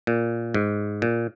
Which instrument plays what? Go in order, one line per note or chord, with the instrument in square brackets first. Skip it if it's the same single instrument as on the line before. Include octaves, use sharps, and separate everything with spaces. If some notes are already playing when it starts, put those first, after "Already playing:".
[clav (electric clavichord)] A#2
G#2
A#2